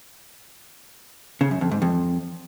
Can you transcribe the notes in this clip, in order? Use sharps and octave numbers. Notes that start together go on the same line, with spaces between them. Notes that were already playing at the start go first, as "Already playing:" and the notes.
C#3
F#2
F2
G#2
F2